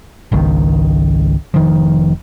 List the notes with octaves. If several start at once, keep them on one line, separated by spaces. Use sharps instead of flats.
G#1 C#2 D#3
F1 D#3 F3